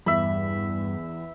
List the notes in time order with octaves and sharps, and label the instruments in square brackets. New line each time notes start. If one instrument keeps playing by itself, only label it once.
[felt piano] E2 [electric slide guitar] G2 [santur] E5 B5